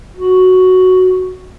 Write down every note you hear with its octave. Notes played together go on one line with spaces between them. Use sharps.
F#4